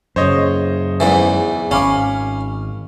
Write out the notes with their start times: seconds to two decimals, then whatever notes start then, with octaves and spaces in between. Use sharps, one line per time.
0.16 F#2 C#3 C5 C#5 D#5
1.00 E2 G#2 E3
1.71 G#1 C#4 F5 B5 D6